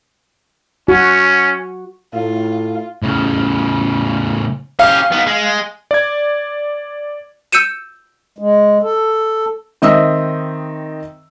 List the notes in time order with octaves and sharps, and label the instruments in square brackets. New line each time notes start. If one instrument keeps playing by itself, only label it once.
[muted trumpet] C#4 [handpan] F#4
[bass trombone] A2 [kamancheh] F4
[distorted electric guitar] A2 C#3
[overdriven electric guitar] C#4 G4 [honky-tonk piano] F5
[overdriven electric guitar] B3 D#4
G#3
[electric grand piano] D5 G#6
[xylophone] E6 G6 C#7 D#7 E7
[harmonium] G#3
A4
[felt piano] D#3 C4 D#5 E5 E6